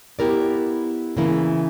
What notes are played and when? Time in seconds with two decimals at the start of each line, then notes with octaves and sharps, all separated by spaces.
0.19 B3 E4 G4 A#4 D5
1.17 C#3 E3 A#3 E4